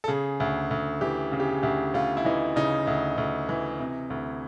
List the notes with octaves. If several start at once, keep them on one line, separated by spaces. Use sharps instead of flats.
A4
C#3 G#4
D2
D2
E3 G4
C#3 G#4
G4
G#4
D2 G4
D2 F4
E4
E3 D#4
C#3 D#4
D2
D2
E3
C3
D2